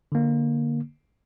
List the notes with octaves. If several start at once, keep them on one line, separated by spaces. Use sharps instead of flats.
D3 A#3